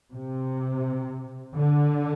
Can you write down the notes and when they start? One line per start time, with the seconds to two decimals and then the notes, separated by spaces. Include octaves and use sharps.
0.13 C3
1.57 D3